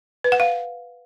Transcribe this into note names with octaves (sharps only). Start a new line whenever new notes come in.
B4
F#5
F5